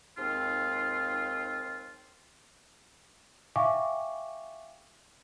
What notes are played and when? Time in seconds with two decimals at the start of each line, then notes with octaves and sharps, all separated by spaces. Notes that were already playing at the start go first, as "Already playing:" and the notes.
0.18 D#2 G#2 C4 F4
3.56 E5 F5 G5 G#5 C#6 D6